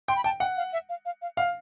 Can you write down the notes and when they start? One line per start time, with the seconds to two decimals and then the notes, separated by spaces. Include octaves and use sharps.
0.08 G5 C6
0.16 B5
0.24 G5 A5
0.40 F#5 G5
0.57 F5
0.73 E5
0.89 F5
1.05 F5
1.22 F5
1.37 F5 F#5